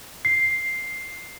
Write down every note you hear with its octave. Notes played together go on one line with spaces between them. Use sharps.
C7